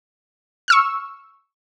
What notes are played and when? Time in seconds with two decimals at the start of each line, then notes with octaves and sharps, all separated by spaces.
0.68 C#6 E6 F6